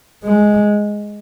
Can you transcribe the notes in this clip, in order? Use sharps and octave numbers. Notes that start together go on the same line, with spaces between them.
G#3